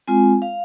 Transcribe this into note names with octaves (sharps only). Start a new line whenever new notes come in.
G#3 C4 F4 G#5
F5